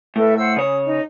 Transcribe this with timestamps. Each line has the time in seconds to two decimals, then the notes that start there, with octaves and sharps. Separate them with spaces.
0.16 A2 A4 B4 E5
0.37 C5 F#5 E6
0.57 C#3 C#5 D#6
0.85 D#4